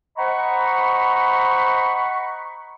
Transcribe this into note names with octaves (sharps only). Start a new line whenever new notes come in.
C5 D#5 F#5 A#5 B5 C#6